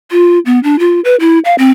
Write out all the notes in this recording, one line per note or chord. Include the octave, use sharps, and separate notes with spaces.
F4
B3
D4
F4
B4
E4
F5
C4